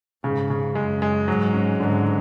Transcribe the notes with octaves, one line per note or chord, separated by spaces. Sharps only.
G#2 C#3
C#3
F#2 G#3
G#3
G#2 F#3
C#4
G#2 D3